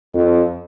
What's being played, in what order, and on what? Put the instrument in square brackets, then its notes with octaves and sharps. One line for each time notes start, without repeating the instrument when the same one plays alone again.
[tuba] F2